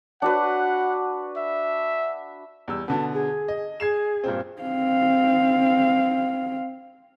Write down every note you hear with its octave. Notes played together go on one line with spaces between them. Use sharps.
D4 F#4 B4 F#5
E5
E2 G3 E6
B2 D3 B3 A5
G#4
D#5
G#4 G#6 C7 E7
G2 A#2 C4
C4 F5